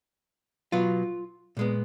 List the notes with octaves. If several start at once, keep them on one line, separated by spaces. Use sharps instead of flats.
B2 F#3 B3 F4
A#2 G#3 B3